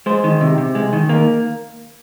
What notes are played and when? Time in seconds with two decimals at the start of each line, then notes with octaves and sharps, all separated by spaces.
0.06 G#3 C5
0.24 D#3
0.41 C3
0.58 C3
0.75 G#3
0.93 D#3
1.09 A#3